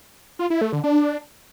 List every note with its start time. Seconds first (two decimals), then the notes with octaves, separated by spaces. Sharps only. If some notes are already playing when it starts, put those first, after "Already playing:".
0.39 F4
0.50 E4
0.61 A3
0.72 D3
0.84 D4